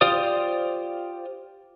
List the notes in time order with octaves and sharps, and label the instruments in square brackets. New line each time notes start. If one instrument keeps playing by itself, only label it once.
[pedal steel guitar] F4 G4 C5 D5 D#6